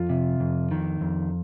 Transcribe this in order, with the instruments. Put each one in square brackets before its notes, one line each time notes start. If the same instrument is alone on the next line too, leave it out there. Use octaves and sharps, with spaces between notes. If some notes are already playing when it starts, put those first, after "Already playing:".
Already playing: [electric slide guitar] F2 [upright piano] F4
[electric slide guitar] C3
F2
D#3
F2